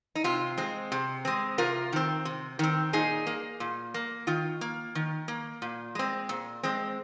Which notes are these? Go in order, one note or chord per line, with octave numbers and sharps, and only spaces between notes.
D#4
C3 F4
G#3 C4
C3
G#3 C4
C3 F4 A#4
D#3 C4
C3
D#3 C4
A#2 D#4 G#4
A#3
A#2
A#3
D#3 F4
A#3
D#3
A#3
A#2
G#3 C4
A#2
G#3 C4